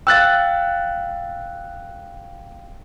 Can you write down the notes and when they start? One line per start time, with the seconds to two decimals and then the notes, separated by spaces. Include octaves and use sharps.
0.07 F5 G5 E6 F#6 A6